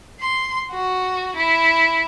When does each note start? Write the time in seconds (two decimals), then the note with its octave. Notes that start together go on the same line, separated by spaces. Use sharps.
0.20 C6
0.71 F#4
1.36 E4